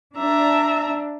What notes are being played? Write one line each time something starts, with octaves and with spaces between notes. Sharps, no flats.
D4 E5 A#5